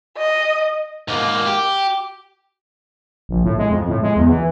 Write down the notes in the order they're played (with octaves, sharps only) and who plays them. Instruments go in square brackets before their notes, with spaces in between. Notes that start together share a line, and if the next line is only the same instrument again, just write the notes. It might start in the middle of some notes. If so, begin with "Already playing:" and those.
[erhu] D#5
[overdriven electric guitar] G#2 A#3
G4
[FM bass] A#1
A2
G#3
F2
A2
G#3
E2
E3